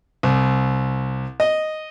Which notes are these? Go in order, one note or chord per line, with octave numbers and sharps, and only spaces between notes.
C2
D#5